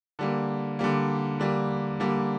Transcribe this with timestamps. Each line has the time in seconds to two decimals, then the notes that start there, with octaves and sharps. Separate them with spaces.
0.19 D3 G3 A#3
0.79 D3 G3 A#3
1.40 D3 G3 A#3
2.00 D3 G3 A#3